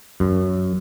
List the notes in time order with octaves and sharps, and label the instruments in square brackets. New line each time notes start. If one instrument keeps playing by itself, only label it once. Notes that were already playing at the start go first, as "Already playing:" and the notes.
[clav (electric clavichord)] F#2